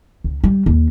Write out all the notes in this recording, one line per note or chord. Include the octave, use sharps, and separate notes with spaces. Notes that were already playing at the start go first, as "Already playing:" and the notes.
C#2
G3
D#2